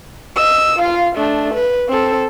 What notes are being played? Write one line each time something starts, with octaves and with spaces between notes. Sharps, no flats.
D#5 E6
F4 F5
A3 D4
B4
C4 A4